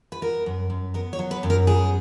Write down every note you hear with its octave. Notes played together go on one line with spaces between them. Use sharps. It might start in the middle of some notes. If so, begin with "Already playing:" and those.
B4
B3 A#4
F#2
F#2
B3 A#4
C#5
F#3
B4
F#2
A#4
B3 G#4